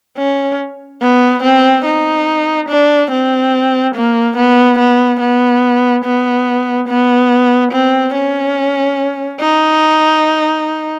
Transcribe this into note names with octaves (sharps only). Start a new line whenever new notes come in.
C#4
B3
C4
D#4
D4
C4
A#3
B3
B3
B3
B3
B3
C4
C#4
D#4